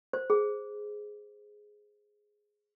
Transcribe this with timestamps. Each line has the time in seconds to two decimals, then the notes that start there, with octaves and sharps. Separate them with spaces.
0.13 C5
0.30 G#4